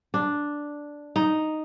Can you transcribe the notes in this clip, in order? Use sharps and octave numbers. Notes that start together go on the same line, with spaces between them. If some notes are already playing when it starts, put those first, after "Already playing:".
D4
D#4